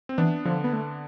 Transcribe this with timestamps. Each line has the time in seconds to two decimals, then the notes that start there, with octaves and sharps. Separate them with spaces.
0.09 C4
0.18 E3 B3 D4
0.45 D3 F3
0.64 B3
0.73 A3